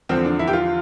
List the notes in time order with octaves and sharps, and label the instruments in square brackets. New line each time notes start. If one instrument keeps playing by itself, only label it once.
[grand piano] E2 D3 F3 [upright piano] C4
[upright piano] D4
E4
G4
F4